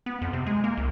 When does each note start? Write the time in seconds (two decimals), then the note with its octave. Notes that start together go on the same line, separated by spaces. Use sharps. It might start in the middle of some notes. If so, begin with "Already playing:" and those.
0.06 B3
0.22 F2
0.33 C3
0.46 G#3
0.64 A#3
0.77 C2